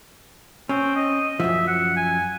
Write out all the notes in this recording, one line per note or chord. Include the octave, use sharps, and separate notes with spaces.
C4 C#4
D#5
F#2 F3 E5
F#5
G#5